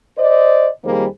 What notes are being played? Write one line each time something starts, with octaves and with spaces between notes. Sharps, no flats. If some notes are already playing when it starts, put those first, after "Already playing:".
C5 D5 D#5
F2 D#3 G3 A#3 G#4 C5